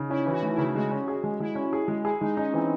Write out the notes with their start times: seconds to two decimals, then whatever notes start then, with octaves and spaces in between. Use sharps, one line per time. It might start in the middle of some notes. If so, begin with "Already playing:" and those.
Already playing: C#3 D#4
0.10 C#4 E4
0.26 E3
0.31 F#4
0.43 A3
0.53 E4
0.58 C#3
0.75 G#3 F#4
0.91 C#4
1.08 G#4
1.24 G#3
1.40 G#3 E4
1.55 C#4
1.73 G#4
1.88 G#3
2.05 E4 G#4
2.21 G#3 D#4
2.37 C#4 D#4
2.53 E3 C4